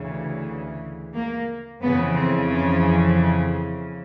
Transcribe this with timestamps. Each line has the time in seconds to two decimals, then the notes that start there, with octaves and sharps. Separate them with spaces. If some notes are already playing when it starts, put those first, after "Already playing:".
Already playing: D2 C#3 E3
1.14 A#3
1.81 F2 C#3 E3 B3
2.15 C4
2.50 C#4